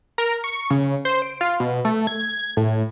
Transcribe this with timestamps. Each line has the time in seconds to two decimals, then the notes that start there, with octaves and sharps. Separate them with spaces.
0.18 A#4
0.44 C#6
0.70 C#3
1.05 C5
1.22 D7
1.41 F4
1.60 B2
1.85 A3
2.07 G#6
2.57 A2